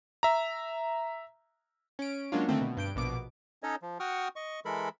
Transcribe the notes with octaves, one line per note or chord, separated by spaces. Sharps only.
E5 A#5
C#4 D7
F#3 G#3 A#3 C#4 D4 F4
D3 D#3 A3 C4
B2
G2 G6 D7
A#1 B2 D6 D7
C#4 D#4 A4 C#5 D#5
F3
F#4 F#5 G5 C#6 D#6 F6
D#5 C#6
E3 G#3 A4 A#4 B5